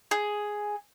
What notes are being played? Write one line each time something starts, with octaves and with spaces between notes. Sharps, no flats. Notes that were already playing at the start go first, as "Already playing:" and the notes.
G#4